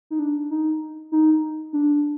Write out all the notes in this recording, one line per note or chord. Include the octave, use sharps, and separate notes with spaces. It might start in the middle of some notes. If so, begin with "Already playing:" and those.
D#4
D4
D#4
D#4
D4